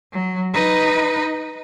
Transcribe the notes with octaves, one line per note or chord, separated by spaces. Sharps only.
F#3
D#4 B4